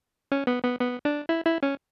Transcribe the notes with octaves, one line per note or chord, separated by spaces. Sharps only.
C#4
B3
B3
B3
D4
E4
E4
C#4